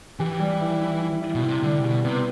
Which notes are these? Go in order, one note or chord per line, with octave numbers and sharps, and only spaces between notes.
E3 G4
G3
E4
E4
E4
E4
B2
C3 E4
D3 G3
C3
B2 G4
C3 B3